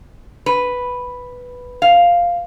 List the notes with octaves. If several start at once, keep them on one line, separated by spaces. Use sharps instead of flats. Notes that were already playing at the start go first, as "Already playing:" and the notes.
B4
F5